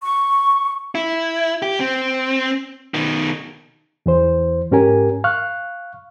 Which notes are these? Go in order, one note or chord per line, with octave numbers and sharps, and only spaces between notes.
C#6
E4
G4
C4
B2 D#3
E2 E3 C5
G#2 C#4 G4 A#4 G#5
F5 C#6 F6 F#6